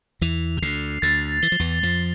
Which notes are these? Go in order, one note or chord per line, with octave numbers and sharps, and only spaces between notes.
E2 E3 F7
C3
D2 D3 C7
D2 D3 A6
E3 G7
F3
E2 E3
F2 F3 G7